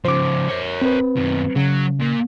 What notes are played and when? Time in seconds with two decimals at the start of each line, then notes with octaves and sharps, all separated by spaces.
0.05 C#3 F3 C5 D6
0.48 A#4 C#5
0.82 C4 B4
1.17 F#2 D#3
1.56 C#3 F#3
2.00 A#2 A#3